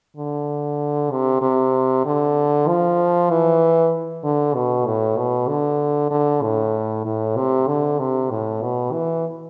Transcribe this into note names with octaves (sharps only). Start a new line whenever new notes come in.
D3
C3
C3
D3
F3
E3
D3
B2
A2
B2
D3
D3
A2
A2
C3
D3
C3
A2
B2
E3